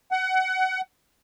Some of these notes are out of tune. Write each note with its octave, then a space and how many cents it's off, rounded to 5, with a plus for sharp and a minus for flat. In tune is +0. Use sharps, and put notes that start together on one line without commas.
F#5 +25